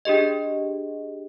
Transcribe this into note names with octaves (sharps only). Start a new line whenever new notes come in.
D4 G4 G#4 D#5